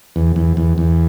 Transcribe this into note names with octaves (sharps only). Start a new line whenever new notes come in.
E2
E2
E2
E2